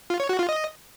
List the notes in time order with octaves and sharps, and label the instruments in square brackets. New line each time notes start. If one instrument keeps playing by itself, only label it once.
[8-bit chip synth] F4
C#5
F#4
F4
D#5